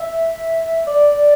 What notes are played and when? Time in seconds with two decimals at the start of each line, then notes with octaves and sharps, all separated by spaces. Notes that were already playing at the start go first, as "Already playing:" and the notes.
Already playing: E5
0.87 D5